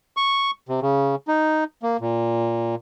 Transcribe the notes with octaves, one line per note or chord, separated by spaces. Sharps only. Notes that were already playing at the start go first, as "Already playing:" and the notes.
C#6
C3
C#3
D#4
A#3
A#2